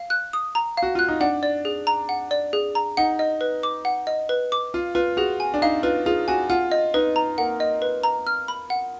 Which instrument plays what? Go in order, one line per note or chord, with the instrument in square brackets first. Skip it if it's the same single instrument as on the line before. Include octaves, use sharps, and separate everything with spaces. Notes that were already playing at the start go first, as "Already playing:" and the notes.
Already playing: [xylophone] F5
F#6
D#6
A#5
F5
[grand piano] F#4
[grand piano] F4 [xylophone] F#6
[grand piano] D#4
[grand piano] D4 [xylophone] F#5
[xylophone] D5
G#4
A#5
F#5
D5
G#4
A#5
[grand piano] D#4 [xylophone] F#5
[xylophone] D#5
B4
D6
F#5
D#5
B4
D6
[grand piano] F4 [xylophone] F5
[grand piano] F4 [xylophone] B4
[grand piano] F#4 [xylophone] G#4
[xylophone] G#5
[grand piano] D4
[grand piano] D#4 [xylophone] F5
[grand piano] F4 [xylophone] B4
[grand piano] F4 [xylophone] G#4
[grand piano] F#4 [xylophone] G#5
[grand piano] F4 [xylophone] F#5
[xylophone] D#5
[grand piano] D#4 [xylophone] B4
[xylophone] A#5
[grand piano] A#3 [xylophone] F#5
[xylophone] D#5
B4
A#5
F6
B5
F#5